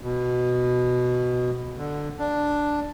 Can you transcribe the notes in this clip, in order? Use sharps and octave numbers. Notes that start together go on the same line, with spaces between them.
B2
D3
D4